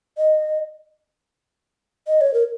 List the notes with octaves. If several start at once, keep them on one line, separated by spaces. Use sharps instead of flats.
D#5
D#5
C#5
A#4